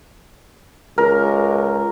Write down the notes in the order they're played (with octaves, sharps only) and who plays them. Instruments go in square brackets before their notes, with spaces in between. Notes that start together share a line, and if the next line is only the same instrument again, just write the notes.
[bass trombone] C#2 [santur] A#4